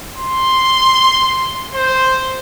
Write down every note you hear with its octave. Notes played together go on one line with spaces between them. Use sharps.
C6
C5